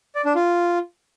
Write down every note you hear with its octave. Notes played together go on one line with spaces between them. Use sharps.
D5
D4
F4